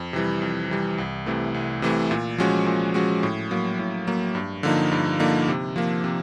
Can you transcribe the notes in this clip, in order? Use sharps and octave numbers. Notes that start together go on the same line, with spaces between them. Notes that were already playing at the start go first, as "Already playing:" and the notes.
Already playing: F2
C3 E3 G3
F2
C3 E3 G3
C2
C3 E3 A3
C2
C3 E3 A3
A#2
F3 G#3 C#4 F#4
A#2
F3 G#3 C#4 F#4
A2
F#3 A#3
A2
F#3 A#3
G2
D3 F3 A#3 D#4
G2
D3 F3 A#3 D#4
C3
F3 A#3
C3